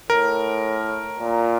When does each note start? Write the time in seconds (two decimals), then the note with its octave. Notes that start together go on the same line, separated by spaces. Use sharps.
0.10 A2 A#4
1.19 A#2